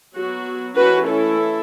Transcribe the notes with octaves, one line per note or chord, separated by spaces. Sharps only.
F#3 B3 F#4
E3 A3 C#4 F#4 B4
E4 A4